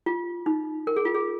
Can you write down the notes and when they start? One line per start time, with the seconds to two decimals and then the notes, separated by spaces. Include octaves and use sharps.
0.06 F4
0.46 D#4
0.87 A#4
0.96 G#4
1.05 F4
1.14 G#4